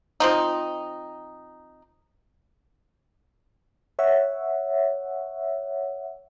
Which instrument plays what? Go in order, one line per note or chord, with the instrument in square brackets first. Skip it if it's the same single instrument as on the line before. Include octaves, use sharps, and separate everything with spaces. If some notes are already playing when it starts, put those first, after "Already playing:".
[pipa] F3 C4 D#4
[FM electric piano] C#5 E5 F#5